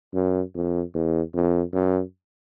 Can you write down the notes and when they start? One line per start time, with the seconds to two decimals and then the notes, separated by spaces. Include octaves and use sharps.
0.14 F#2
0.55 F2
0.94 E2
1.34 F2
1.73 F#2